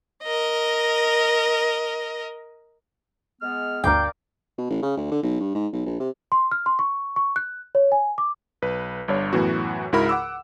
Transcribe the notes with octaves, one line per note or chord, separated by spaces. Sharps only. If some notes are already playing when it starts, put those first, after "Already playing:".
A#4 D#5
G#3 B3 F6
G1 D2 A#4 D5 F5 G5
B2
A1
C#3
D2
D3
B1
G2
G#2
B1
A#1
C3
C6
F6
C6
C#6
C#6
F#6
C#5
G#5
D6
B1 B4
G1 G2 C#5
F#2 A2 E3 B3 F#4
C#2 G#2 E4 F#4 A#4 B5
F#5 D6 E6